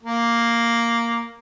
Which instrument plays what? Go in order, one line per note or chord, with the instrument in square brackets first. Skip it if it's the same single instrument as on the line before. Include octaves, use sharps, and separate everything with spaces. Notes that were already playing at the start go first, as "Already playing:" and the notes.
[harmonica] A#3